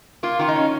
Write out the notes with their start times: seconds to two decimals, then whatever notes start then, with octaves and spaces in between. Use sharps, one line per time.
0.23 A#3 F4
0.39 D#3 F4
0.48 D#4
0.55 C#4